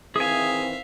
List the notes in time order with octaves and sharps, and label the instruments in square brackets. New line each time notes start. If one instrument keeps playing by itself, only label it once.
[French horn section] D#3 E3 C4 [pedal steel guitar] G#4 G#5 [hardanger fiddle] E5 F5